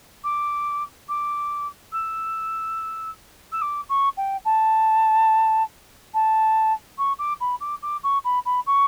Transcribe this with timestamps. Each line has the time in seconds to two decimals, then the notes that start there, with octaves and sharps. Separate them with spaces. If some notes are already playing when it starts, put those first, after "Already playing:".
0.24 D6
1.09 D6
1.92 E6
3.52 E6
3.61 D6
3.89 C#6
4.17 G5
4.45 A5
6.14 A5
6.98 C#6
7.19 D6
7.40 B5
7.60 D6
7.82 D6
8.03 C#6
8.24 B5
8.45 B5
8.66 C#6